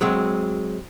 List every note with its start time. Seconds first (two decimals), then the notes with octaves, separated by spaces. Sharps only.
0.01 F#3 G#3 C4